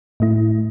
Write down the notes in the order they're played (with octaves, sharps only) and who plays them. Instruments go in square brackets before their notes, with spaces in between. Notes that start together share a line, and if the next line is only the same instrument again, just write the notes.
[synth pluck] A2 A3 E4